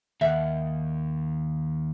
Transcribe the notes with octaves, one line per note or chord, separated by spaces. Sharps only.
D#2 E5 F#5